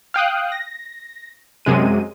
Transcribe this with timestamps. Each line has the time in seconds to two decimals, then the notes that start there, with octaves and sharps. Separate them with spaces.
0.14 F5 G5 D#6 F#6
0.52 A#6
1.65 F#2 C3 G#3 D#7